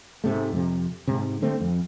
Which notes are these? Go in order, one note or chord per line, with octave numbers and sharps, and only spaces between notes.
G#2 C3 A3
F2 C3
G#2 C3
D3 A3 C4
F2